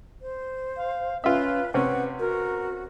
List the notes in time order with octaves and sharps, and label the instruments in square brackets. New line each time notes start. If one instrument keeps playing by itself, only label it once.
[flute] C5
[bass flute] F5
[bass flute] C#4 [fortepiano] F4 E5 [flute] B4
[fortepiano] C3 C4 C#4 [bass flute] B4 [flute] F#5
[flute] F#4 [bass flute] A#4